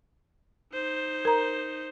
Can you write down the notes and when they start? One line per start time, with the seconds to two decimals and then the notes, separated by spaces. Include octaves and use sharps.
0.74 D#4 C5
1.25 A#4 A#5